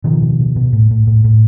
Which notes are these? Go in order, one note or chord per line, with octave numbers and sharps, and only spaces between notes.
B2 D#3 F3
B2
B2
B2
A2
A2
A2
A2